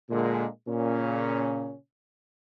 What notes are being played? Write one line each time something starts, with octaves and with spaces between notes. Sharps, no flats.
A#2 D3 G#3
A#2 C#3 C#4